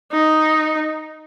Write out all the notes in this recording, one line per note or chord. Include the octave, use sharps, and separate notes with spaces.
D#4